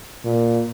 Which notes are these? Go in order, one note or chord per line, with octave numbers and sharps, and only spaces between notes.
A#2